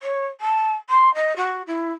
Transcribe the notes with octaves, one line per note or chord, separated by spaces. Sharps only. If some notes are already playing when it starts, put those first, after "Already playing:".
C#5
A5
C6
D#5
F#4
E4